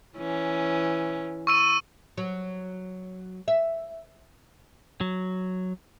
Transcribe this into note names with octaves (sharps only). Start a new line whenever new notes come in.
E3 C#4
C#6 E6 D#7
F#3
E5
F#3